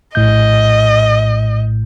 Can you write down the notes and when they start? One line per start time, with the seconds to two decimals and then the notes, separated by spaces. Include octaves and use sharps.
0.15 A#1 A2 D#5 G6